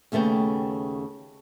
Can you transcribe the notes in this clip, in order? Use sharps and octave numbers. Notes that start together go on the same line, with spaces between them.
D#2 C#3 A3 B3 G5